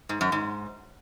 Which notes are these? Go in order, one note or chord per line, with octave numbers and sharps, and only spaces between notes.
G#2
F#2
G#2